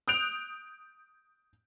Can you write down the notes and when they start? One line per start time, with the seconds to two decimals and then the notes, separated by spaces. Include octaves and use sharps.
0.08 D#6 F#6 G6 D7 F7